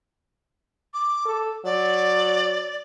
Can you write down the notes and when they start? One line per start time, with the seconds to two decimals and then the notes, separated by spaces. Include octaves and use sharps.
0.94 D6
1.26 A4
1.65 F#3 D5